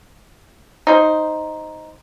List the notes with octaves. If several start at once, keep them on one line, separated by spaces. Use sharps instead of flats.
D#4 C5